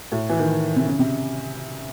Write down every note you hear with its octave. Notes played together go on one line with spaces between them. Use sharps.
A2
E3
D#3
C3
C#3
C3